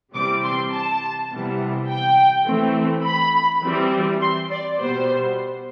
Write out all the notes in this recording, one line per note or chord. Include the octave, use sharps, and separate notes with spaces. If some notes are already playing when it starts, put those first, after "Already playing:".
C3 E3 G3 C4 D6
C6
A5
C3 E3 G3 B3
G5
E3 A3 C4
B5
E3 G3 C4
C6
D5
B2 G3 B3 C5